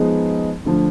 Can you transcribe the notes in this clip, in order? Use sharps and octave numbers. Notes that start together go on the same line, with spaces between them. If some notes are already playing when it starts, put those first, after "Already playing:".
Already playing: F3 G#3 B3 D#4 G#4
D2 D3 F3